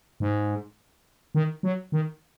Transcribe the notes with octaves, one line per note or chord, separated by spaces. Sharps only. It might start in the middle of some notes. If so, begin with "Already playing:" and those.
G#2
D#3
F#3
D#3